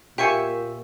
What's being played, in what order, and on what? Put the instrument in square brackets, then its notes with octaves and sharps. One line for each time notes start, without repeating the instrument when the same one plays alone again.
[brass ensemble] A#2 [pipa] G4 G#5 [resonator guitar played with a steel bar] C5 E5 [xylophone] F5 C#6 C#7